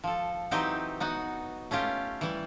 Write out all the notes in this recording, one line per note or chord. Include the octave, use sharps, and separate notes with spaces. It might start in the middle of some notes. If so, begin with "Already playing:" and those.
F3 A4
E3 F#3 C4 D#4 G4
B3 D#4 F#4
A3 C#4 F4 G4
E3 G3